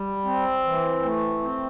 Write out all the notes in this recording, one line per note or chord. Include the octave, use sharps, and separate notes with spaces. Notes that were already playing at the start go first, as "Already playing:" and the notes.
Already playing: G3
C4
E3
A3
C4